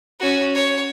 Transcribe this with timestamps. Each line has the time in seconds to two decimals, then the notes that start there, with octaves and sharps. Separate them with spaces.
0.20 C#4 F#4
0.54 C#5